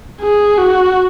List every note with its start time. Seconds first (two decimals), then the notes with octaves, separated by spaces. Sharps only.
0.21 G#4
0.58 F#4